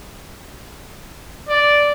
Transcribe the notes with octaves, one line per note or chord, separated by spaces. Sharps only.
D5